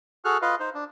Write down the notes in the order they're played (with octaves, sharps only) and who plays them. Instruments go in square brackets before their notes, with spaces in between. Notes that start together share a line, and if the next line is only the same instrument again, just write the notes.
[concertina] F#4 G#4 A4 F6 F#6
F4 B4 D#5 F5
D#4 C5
D4